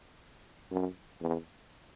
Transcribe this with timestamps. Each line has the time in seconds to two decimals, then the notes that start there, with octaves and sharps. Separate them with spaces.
0.71 F#2
1.20 E2